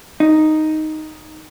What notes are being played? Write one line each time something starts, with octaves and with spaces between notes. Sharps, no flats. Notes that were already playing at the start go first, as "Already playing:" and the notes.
D#4